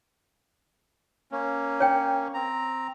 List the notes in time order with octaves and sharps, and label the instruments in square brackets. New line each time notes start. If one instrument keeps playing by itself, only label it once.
[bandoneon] A#3 C#4
[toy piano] C#5 G5
[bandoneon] C4 A#5